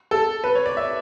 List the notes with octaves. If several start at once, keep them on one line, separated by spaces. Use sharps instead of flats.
A4
B4
C#5
D5
E5